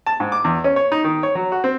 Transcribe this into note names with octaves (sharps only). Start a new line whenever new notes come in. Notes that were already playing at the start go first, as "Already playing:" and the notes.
A5
G#2
D6
E2
C#4
C#5
D#4
D#3
C#5
F#3
F#4
C4